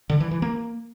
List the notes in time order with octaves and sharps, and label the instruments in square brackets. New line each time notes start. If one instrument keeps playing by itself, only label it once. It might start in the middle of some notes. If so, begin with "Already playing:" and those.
[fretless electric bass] D3
E3
E3
A#3